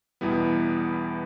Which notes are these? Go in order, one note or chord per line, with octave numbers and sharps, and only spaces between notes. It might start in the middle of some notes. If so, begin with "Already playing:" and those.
E2 B2 G3 B3 E4